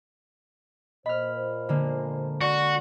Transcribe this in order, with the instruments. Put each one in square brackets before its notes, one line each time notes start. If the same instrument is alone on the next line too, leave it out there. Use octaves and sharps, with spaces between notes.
[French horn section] A#2 C5 [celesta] D#5 [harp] B5 F6
[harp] D3 G#3 A#3
[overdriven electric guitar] F#4 [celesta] D5